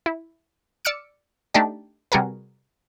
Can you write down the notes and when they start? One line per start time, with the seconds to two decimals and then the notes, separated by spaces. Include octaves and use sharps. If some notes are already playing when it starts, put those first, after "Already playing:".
0.06 E4
0.85 D5 D6 E6 F6 C#7 D7
1.54 A3 D4 D#4 G4 D5
2.12 C3 G3 F#4 G#4 A#4 B4